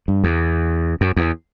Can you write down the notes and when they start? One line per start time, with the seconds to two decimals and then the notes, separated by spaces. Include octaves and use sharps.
0.08 G2
0.24 E2
1.01 F#2
1.16 E2